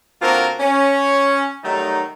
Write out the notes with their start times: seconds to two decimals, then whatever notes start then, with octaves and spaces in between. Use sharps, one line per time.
0.21 D3 A#3 C4 F4 F#4 A#4
0.60 C#4
1.64 D#3 F#3 G3 A3 D#4